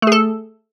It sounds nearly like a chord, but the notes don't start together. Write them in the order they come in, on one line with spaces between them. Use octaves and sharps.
A3 G#4 A4